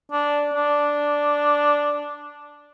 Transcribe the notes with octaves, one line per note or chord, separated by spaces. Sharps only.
D4
D4